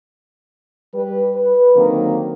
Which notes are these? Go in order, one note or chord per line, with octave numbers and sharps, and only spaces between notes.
G3 B4
B4
D3 D#3 F#3 A#3 C4